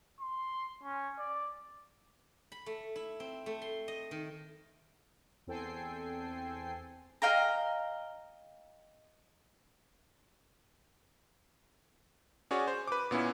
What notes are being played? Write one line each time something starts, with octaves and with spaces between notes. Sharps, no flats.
C6
C#4
D5
B5
A3
E4
C4
A3
C6
D#5
D#3
E2 C4 A4 G5 G#5 C7
D#5 F5 G5 A#5
C#4 F#4 G#4 C#5 D5
C5
B4 D6
A#2 B3 C#4 E4